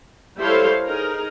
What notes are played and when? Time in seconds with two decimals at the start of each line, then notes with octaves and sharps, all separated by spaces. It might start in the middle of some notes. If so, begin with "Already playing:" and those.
0.39 G3 E4 A4 C5 C#5 F5
0.85 D#4 G#4 A#4